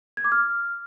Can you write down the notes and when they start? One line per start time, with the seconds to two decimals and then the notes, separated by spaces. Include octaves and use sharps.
0.17 G#6
0.24 D6
0.32 F6